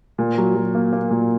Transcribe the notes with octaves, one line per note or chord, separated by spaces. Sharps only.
A#2
F#3
F#3
A#3
A#3
A#2